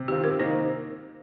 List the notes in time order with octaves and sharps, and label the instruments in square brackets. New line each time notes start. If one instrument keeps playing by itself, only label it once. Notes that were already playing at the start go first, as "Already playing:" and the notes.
Already playing: [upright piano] C3
[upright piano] D#3 C4 F4 [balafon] G4
[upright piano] C3 [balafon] A#4
[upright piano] D#3 A#3 D#4 [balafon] C5